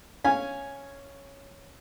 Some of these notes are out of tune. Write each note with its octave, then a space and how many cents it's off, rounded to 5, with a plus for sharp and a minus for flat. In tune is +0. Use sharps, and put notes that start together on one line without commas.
C#4 +0 F5 +0 G#5 +0